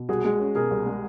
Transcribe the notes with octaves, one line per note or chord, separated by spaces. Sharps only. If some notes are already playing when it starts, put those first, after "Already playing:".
Already playing: B2
C2 F#4 G#4
G#3
C#4
B2 G#4 A#4
C2
G#3